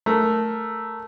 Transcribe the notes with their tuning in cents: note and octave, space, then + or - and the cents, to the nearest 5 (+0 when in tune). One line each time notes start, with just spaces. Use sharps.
A3 +0 A#4 +0